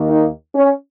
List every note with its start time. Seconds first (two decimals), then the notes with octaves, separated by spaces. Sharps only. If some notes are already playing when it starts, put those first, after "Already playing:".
Already playing: D#2 D#3 A#3
0.09 D#4
0.55 C#4